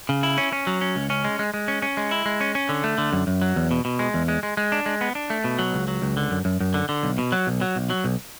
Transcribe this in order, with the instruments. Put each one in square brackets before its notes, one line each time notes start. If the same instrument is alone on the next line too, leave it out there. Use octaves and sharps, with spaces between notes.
[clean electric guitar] C#3
E4
C#4
C#4
F#3
C#4
C#2
C#4
G#3
G#3
G#3
C#4
C#4
G#3
E4
G#3
C#4
C#4
D3
A3
D3
F#2
F#2
F#3
E2
B2
B2
G#3
E2
G#3
G#3
G#3
D4
G#3
B3
D4
A3
B2
F#3
C#2
F#3
C#2
D3
F#2
F#2
F#2
D3
D3
B1
B2
F#3
B1
F#3
B1
F#3
B1